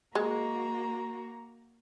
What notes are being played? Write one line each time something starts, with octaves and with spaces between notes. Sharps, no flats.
G#3 A#3 F#4 A#5